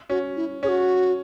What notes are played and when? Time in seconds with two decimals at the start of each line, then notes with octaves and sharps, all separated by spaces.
0.10 C#4 F#4
0.36 E4
0.63 C#4 G#4
0.69 F#4